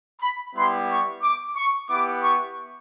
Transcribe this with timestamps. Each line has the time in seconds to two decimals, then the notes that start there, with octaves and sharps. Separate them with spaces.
0.20 B5
0.54 G3 B3 E4 G4 C6
0.89 C#6
1.22 D6
1.55 C#6
1.89 B3 E4 G4 D6
2.22 C#6